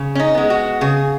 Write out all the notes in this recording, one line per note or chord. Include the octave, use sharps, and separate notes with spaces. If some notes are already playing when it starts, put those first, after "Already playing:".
Already playing: C#3
C#4
D#4
G#3 B3
F#4
C#3 G#4